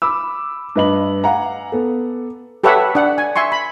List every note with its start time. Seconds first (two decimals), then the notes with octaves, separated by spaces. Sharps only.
0.02 B5 D6 E6
0.76 G2 B4 D#5 B5 F#7
1.24 F5 F#5 G#5 A#5
1.72 B3 A4
2.64 G4 A4 B4 C#5 E5 F#5
2.95 D4 F#5
3.18 G#5
3.36 E5 G#5 C6 C#6
3.52 B5